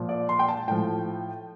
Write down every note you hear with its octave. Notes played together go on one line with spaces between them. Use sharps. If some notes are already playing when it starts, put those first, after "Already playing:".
Already playing: A#2 F3
D5
C6
G5
A5
A2 F3 G5